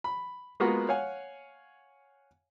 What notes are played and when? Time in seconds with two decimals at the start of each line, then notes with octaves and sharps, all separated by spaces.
0.04 B5
0.60 G#3 A#3 B3 F4 F#4
0.89 C#5 F5 F#5 G#5